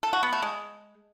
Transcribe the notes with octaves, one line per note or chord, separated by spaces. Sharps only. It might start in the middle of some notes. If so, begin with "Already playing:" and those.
A4
F#4
B3
A3
G#3